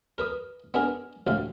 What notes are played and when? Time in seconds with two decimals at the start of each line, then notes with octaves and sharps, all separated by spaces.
0.18 A#4 B4 D#6
0.74 B3 D4 G#4 A#4
1.27 A1 D2 F5